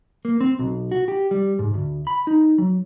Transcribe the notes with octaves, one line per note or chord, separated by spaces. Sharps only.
A#3
C4
B1
F#4
G4
G3
G#2
D2
B5
D#4
F#3